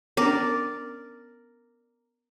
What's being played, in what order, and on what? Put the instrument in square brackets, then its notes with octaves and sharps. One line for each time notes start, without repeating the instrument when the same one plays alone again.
[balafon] B3 C#4 D4 [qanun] A#4 D5